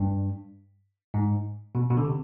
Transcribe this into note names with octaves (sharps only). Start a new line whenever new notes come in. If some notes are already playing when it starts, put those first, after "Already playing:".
Already playing: G2
G#2
B2
B2
D3
C3